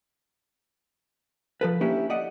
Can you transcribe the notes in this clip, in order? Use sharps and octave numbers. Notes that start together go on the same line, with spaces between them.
F3 A4 B4
A#3 C#4 D4 E4 G4
D5 D#5 F#5